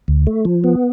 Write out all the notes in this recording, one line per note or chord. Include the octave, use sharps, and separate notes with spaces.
D2
A3
F3
B3